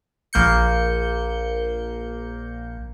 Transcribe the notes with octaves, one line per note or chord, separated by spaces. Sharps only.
A#1 A#3 G6 C#7